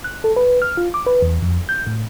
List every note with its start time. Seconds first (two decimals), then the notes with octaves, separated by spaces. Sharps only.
0.04 F#6
0.24 A4
0.36 B4
0.62 F6
0.77 F4
0.94 D6
1.06 B4
1.22 E2
1.42 F2
1.69 G6
1.87 A2